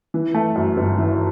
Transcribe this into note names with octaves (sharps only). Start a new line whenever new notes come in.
E3
A3
F#2
G1
E3